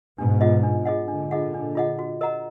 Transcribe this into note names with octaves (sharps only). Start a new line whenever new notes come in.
G#2 B2 D4
F4 G#4 D#5 F#5
D4
F4 G#4 D#5 F#5
A#2 D3 D4
F4 G#4 D#5 F#5
D4
F4 G#4 D#5 F#5
F#4
A#4 D#5 F#5 A#5